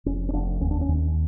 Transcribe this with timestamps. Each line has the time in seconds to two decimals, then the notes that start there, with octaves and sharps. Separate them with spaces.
0.06 F1 C#4
0.29 C#4
0.33 F1 D4
0.60 D#2 C#4
0.71 D4
0.81 C#4
0.89 D#2